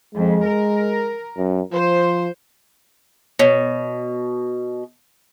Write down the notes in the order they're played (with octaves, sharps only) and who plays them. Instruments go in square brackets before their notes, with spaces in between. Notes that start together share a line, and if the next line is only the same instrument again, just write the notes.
[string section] F2 [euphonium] G#3
[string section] A#4
[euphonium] F#2
[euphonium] F3 [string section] C5
[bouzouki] B2 [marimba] C#5